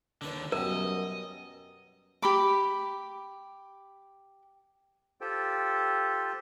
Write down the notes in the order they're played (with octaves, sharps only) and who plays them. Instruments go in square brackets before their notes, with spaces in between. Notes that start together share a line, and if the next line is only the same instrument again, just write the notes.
[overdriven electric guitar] D#2 D3 [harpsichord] D4 B4 D5
[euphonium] F#2 [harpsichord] B2 G3 [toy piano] A#4 [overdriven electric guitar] D#5
[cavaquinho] G4 B5 D6
[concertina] F4 G4 A4 C5 G5